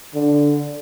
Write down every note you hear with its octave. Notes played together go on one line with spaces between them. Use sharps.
D3